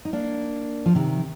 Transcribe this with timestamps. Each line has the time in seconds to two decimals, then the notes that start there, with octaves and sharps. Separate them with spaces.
0.05 D#4
0.13 A#3 D4
0.86 F3
0.95 C3 D#3